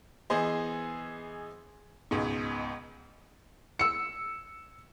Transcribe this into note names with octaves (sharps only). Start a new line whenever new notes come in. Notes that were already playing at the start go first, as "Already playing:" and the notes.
E3 B3 G#4 C5 D#5
C#2 G#2 B2
E6 C#7